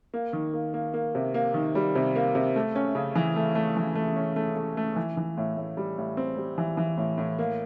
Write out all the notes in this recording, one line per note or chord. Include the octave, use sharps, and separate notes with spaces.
A#3
D#3
A#3
A#3
A#3
C3
A#3
D#3
G3
C3
A#3
C3
A3
C#4
C#3
E3
A3
A3
E3
A3
C#4
A3
A3
A3
E3
E3
A2
A2
G3
A2
C4
G3
E3
E3
A2
A2
A#3